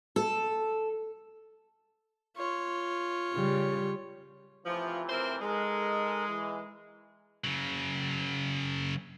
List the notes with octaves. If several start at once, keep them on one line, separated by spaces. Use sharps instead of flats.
A4
F4 C#5
C#3 G3
A2 C3 E3 F3
C4 A#4 C5
G#3 D#4 A4 A#4
E3
C#3 F#3